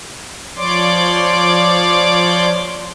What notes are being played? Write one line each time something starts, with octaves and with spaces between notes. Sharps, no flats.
F3 C#5 D5 C6 D6